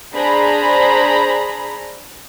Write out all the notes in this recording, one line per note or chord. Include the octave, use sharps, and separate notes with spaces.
D4 G#4 C5 A#5 B5